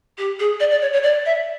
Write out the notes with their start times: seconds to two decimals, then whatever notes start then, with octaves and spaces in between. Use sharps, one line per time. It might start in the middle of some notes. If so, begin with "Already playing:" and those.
0.18 G4
0.39 G#4
0.60 D5
0.71 D5
0.81 C#5
0.93 C#5
1.03 D5
1.26 E5